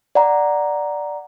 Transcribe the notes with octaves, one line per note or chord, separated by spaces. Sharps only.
D5 F#5 A#5